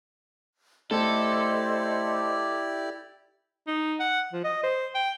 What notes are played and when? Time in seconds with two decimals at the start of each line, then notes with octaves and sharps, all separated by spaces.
0.91 A3 E4 G4 A4 C5 D5 D#5 C6
3.67 D#4
4.00 F#5
4.33 F3
4.44 D#5
4.63 C5
4.95 G5